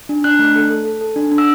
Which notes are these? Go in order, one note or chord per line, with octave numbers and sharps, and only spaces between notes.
D4
D4 F#6
A3
A4
A4
A4
A4
D4
D4
E6